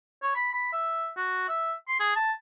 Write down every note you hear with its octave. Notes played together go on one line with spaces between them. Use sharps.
C#5
B5
B5
E5
F#4
E5
C6
G#4
A5